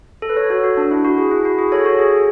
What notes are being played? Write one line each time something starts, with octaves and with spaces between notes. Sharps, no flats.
A4
B4
A4 C#5
F#4 A4
F#4
D4
E4
F#4
G#4
E4
F#4
G#4
A4 C#5
F#4 A4
G#4